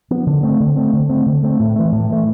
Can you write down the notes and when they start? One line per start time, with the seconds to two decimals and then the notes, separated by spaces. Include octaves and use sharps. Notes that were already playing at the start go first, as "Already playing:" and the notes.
0.10 F3 B3
0.27 D3
0.43 A3 C4
0.60 D3
0.76 A3 C4
0.93 D3
1.09 A3 C4
1.26 D3
1.43 A3 C4
1.59 A2
1.76 E3 A3
1.92 A2
2.10 E3 A3